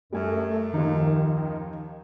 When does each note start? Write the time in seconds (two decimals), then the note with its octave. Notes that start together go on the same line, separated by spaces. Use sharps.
0.13 F#2 G3 A3 G#5
0.74 D#2 D#3 F3 D#4